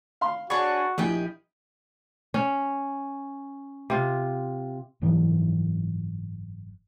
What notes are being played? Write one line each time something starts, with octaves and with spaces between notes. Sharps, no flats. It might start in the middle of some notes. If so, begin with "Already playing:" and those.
F5 B5 C6
D4 F#4 G#4 B4 C#5 D5
A#1 E4 G4 G#4 D#5 G5
C#4
C3 F4
F#1 G#2 E3 F#3